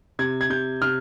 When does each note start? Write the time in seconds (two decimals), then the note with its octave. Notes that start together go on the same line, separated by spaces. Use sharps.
0.19 C3 G#6
0.41 G#6
0.50 C3 G6
0.82 C3 F6